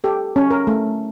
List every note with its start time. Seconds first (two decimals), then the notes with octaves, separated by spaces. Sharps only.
0.04 G4 A4
0.36 C#4
0.50 A#4
0.67 A3